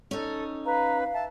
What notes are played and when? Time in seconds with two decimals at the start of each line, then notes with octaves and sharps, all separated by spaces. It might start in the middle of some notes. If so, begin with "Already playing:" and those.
0.11 C#4 D#4 A4
0.66 B4 F5 A#5
1.14 E5 A5